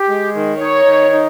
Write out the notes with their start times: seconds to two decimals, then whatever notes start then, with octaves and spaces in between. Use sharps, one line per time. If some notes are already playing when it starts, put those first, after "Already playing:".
Already playing: G4
0.09 G#3
0.35 D#3
0.61 D#4 C#5
0.86 D#3
1.12 D#4